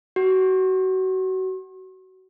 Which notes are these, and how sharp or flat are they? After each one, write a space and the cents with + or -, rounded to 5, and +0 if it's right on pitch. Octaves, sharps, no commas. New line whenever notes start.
F#4 +25